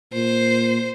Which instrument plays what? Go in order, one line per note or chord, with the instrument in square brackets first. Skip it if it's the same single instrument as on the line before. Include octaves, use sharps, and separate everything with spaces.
[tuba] A#2 [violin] C5